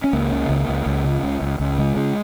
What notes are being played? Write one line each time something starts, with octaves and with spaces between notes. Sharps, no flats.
C#4
C#2 A#3
C#3
C#2
C#2
C#2
C#3
C#2
C#2
C#2
C#3 G#3
C#3